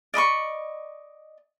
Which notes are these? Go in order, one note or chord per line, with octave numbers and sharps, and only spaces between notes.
D5 D#5 B5 C#6